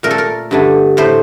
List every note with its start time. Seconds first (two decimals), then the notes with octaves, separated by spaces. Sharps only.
0.03 A#2 A3 A#4
0.11 A4
0.18 A#4
0.51 G2 D3 A3
0.97 A2 A3 C5